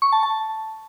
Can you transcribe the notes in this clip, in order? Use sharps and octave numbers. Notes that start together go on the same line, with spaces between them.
C#6
A5
A5